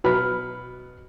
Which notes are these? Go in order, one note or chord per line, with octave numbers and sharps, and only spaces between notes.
B2 F#3 B4 B5 F6